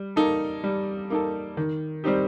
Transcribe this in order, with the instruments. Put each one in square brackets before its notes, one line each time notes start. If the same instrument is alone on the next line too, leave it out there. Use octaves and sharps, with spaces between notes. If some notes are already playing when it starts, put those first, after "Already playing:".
Already playing: [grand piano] G3
A#3 D#4 A4
G3
A#3 D#4 A4
D#3
G3 C4 D#4 G4